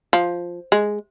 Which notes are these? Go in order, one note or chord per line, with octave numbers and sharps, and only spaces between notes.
F3
G#3